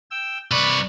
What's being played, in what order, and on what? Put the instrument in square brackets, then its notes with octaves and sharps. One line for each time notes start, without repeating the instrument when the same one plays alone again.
[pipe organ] G5 E6
[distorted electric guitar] C2 B4 [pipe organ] D5 B5 C#6